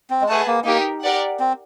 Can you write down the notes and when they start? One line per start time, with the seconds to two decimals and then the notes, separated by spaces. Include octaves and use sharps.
0.10 C4
0.22 G#3
0.28 A3 G#4 B4 D#5 F#5 A5
0.47 A#3
0.65 A#3 D#4 G4 A#4
1.02 G4 A#4 D5 F#5
1.40 C4